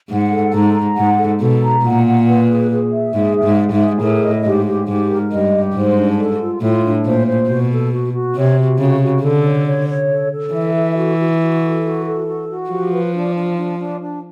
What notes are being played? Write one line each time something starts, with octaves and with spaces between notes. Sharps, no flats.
G#2 F#5
A4
G#2 A#5
A#5
G#2 F#5
A4
B2 A4
A#5
A#2 F#5
F#5
B4
G#4
G#4
E5
G#2 G#4
E5
G#2
G#4
G#2
G#4
A2 A#4
D#5
G#2 G4
G4
G#2 G4
A#4
G2 D#5
G4
G#2 C5
D4
A4
F4
A2 F4
D4
A#2 C5
C5
B2 F#4
A4
F#4
F#4
C3 C#5
F#4
C#3 F#4
F#4
D3 A4
C#5
C#5
C#5
A4
A4
E3 E5
A4
F#4
F#4
F#4
A4
F#4
A4
F#4
F#4
F3 G4
B4
D4
D4
D4
D4
D4